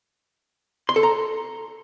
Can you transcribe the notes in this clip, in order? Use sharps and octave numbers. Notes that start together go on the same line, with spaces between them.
C6
A4
A#5